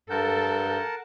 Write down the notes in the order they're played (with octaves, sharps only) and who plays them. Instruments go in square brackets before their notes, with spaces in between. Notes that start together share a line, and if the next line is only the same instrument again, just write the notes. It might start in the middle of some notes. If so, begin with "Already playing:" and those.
[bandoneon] G2 G6 [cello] A4 [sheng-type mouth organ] A#4 F#5 A5